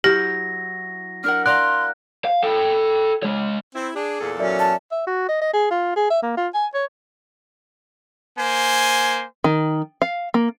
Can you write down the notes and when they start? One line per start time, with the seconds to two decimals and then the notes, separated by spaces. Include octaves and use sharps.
0.04 F#3 E4 G4 G6 A#6
1.24 D4 A#4 F#5 F6
1.46 D5 F5 A#5 C6 F#6
2.25 F5
2.43 A4 G5
3.23 G#3 C#5
3.75 C4 E4
3.95 D4 G#4
4.20 E2 A#2 A4
4.40 F#3 C#4 A#4 D5 E5
4.59 A5
4.92 E5
5.07 F#4
5.29 D#5
5.41 D#5
5.54 G#4
5.71 F4
5.96 G#4
6.10 E5
6.23 A#3
6.37 F4
6.54 G#5
6.74 C#5
8.37 A#3 C5 G#5
9.44 D#3
10.02 F5
10.34 A#3